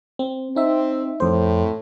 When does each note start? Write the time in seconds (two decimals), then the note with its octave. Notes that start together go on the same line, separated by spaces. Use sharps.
0.19 C4
0.56 C4 D#4 E5
1.20 F2 A2 C5